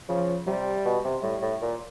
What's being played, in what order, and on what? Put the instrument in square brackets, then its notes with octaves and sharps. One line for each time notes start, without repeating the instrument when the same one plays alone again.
[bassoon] C#3 [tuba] F3
[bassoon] C3 [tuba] G3
[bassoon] B2
C3
[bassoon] A2 [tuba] G3
[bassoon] A2
A#2